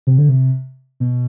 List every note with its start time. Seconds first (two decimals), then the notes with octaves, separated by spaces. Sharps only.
0.07 C3
0.18 D3
0.29 C3
1.00 B2